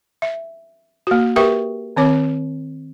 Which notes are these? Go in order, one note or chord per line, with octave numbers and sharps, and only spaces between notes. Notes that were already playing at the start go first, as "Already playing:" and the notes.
E5
A#3 F#4
G4 A#4 B4 E5 G5 C#6
D#3 C4 C#5 D6